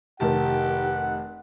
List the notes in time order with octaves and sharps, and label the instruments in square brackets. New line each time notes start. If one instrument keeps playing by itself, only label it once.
[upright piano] F1 D#3 A5 [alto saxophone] G4 [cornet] F#5